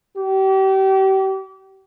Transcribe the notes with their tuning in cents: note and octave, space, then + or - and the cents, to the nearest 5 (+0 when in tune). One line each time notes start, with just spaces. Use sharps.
G4 -35